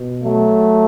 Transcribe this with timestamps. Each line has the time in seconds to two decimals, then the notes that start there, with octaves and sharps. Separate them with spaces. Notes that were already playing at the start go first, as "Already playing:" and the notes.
Already playing: B2
0.23 F#3 A3